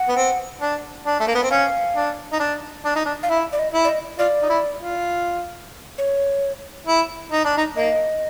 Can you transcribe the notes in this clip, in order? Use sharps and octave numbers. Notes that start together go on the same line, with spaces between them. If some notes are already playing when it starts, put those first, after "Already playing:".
Already playing: F#5
B3
C4
D4
D4
A3
A#3
B3
C4
C#4 F5
D4
D#4
D4
D4
D#4
D4
F5
E4 E5
D5
D#5
E4
D5
D#5
F4 D5
D#4
E4
F4
C#5
E4
D#4
D4
D#4
A#3 D#5